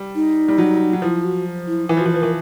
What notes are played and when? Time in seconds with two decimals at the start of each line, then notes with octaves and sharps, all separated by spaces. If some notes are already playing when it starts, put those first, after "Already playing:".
Already playing: G3
0.15 D#4
0.48 G3
0.58 F#3
0.93 F#3
1.02 F3 E4
1.24 F#4
1.67 E4
1.89 E3 E4
1.97 F3 F#4
2.06 E3
2.14 F3 B4
2.22 E3 A#4